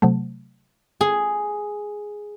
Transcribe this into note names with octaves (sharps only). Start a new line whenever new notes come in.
C3 F#3 A3
G#4